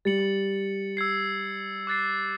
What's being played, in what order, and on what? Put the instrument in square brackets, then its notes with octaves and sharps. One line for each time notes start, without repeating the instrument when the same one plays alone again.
[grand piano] G3 [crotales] A6 C#7 F#7
[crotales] E6 G#6 C7
D6 F#6 A6 C7